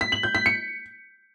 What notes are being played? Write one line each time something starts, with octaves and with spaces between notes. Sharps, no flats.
B6
F#7
G6
B6
C#7